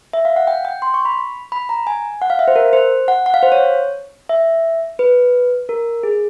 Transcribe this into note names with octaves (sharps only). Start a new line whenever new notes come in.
E5
F5
F#5
G5
G5
C6
C#6
B5
B5
A#5
G#5
F#5
F5
E5
C5
A#4
C5
F#5
F#5
F5
C5
C#5
E5
B4
A#4
G#4